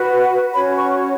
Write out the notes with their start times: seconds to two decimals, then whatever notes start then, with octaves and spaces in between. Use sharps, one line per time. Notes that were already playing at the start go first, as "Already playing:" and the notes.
Already playing: F#4 B4
0.53 C#4 F#4 C#5 B5
0.78 C#6